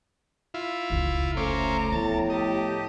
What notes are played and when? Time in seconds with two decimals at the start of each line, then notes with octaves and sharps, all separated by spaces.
0.54 E4 F4
0.90 F1 C#2
1.37 A3 C#4 C5 A#5 D6
1.92 A2 F3 B3 A5
2.30 G4 A4 D#5